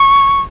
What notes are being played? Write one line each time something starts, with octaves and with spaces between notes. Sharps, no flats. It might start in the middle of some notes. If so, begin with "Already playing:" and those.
Already playing: C#6